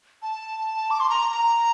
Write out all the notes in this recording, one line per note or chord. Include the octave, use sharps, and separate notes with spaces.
A5
D6
C6
A#5
A#5